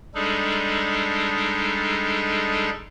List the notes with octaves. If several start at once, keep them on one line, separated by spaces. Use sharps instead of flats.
G3 G#3 D4 D#4 G#4 A4